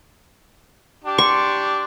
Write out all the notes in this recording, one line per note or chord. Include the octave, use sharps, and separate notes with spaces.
D4 G4
C6 C#6